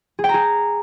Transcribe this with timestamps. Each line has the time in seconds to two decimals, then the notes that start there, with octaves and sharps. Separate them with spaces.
0.19 G#4
0.24 G5
0.29 A#5
0.34 G#4